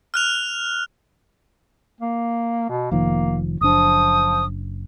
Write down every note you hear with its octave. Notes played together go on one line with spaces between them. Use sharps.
F6 F#6 F7
A#3
B2
F1 D#3 F3 A#3
F#1 F3 D4 D#6